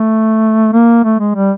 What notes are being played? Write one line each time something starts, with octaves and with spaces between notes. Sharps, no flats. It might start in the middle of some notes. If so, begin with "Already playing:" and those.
Already playing: A3
A#3
A3
G#3
G3